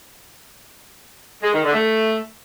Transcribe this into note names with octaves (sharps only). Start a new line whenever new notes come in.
G#3
D#3
D3
A3